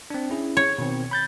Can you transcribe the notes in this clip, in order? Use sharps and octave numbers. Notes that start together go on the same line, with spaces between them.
C4 D4
C#4 E4 G#4
C#5
B2 D#3 C4
B5 G6 A6